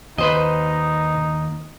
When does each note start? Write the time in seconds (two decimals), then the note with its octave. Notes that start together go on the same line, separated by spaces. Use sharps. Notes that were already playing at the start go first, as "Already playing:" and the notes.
0.18 D#2 D#4 B4 C5 D#5